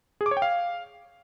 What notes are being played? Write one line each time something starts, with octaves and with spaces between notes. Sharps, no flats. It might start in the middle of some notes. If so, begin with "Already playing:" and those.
G#4
D6
C#5
G5
F5